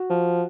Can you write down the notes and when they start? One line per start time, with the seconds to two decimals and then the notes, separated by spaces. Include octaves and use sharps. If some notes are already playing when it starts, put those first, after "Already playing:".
Already playing: F#4
0.10 F3